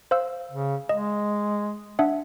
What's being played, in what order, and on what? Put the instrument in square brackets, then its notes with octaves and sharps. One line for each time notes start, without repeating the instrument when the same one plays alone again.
[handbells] C5 F5 E6
[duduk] C#3
[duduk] G#3 [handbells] D#5
[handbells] D4 E5 F#5